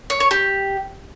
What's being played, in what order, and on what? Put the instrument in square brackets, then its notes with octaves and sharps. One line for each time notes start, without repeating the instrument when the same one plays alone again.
[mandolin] C#5
C#5
G4